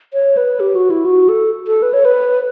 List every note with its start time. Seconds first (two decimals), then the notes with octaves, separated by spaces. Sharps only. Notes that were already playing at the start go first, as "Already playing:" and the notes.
0.13 C#5
0.37 B4
0.60 G4
0.75 F#4
0.90 E4
1.05 F#4
1.29 A4
1.67 A4
1.82 B4
1.94 C#5
2.05 B4